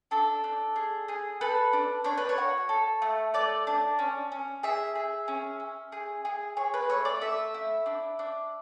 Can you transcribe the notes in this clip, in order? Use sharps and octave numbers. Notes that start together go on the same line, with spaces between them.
D4 A4
D4
G#4
G#4
A4 B4
D4
D4 C#5
B4
C#5
F#4
A4
A3
A3 D5
D4
C#4
C#4
G#4 E5
G#4
C#4
C#4
G#4
G#4
G#4 C#5
B4
A3 C#5
D5
A3 E5
E4
D4
D4